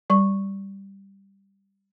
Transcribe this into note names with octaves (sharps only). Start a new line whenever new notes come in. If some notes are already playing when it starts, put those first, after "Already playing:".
G3 C#6